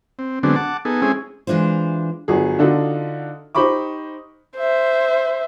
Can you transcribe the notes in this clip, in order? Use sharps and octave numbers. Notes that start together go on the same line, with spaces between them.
C4
D3 F#3 G#3 B3 C4 D4
F#5 A5 D6
B3 D#4 G#4 A4
G#3 C4 C#4 E4 G#4
E3 G#3 D4 F4 C5
G1 F#3 G#4
D3 D4 D#4 F4 F#4 A4
D#4 G4 C5 B5 C#6 D6
C5 E5